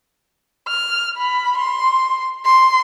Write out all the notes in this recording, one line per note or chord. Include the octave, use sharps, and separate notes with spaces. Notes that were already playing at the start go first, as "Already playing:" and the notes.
F6
B5
C6
C6